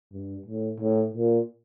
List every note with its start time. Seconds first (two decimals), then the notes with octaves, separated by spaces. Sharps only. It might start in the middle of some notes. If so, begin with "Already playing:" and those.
0.12 G2
0.46 A2
0.80 A2
1.14 A#2